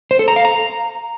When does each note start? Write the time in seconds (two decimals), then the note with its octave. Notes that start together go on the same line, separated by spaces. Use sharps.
0.11 C5
0.19 A4
0.28 A#5
0.36 F5
0.45 A#5